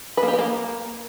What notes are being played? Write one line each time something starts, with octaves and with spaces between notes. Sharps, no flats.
B4
A#3
G4
A#4
A#3